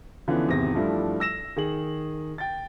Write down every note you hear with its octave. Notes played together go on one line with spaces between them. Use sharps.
D3 E3 F3 B3 C#4
G#1 E2 C3 C4 A#6
G2 F3 G3 A3 D4 E4
E6 A#6 E7
D#3 G#4 F#7
G5 A6